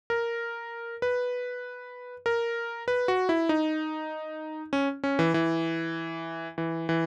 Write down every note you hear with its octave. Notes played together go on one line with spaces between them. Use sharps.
A#4
B4
A#4
B4
F#4
E4
D#4
C#4
C#4
E3
E3
E3
E3